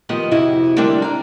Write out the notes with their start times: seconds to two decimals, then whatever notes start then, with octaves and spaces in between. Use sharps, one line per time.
0.09 D#3 F3 B3 G4 D#5
0.31 F2 C3 E4 F#4 D#5
0.77 D3 G3 A#3 C4 D4
1.02 D5 A#5